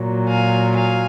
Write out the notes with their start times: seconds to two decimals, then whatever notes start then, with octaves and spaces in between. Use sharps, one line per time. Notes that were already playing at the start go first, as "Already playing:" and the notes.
Already playing: A#2 F#3
0.28 F5 G#5
0.76 F5 G#5